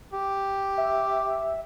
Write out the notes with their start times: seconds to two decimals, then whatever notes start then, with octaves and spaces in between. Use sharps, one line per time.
0.13 G4
0.78 E5